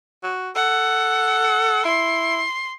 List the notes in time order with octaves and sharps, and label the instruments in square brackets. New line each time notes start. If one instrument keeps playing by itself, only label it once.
[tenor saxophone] F#4
[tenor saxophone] A4 [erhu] F#5
[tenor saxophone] E4 [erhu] C6